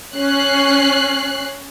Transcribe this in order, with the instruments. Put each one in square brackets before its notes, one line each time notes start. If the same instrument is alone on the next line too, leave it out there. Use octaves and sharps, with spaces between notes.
[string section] C#4 F#6 C7